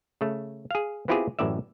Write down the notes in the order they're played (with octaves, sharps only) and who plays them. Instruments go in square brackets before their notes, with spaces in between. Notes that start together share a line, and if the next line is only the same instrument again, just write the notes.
[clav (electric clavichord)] C#3 A3
G#4 F5
B3 C4 E4 F4 G4 G#4
A1 F#2 A2 D5 E5